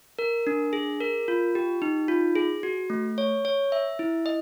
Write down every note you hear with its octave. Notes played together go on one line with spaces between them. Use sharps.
A#4
D4
G#4
A#4
F4
G4
D#4
F4
G#4
F#4
A3
C#5
C#5
E5
E4
D#5